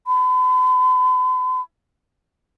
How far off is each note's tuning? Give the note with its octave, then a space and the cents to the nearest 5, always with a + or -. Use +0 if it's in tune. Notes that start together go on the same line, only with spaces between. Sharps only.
B5 +45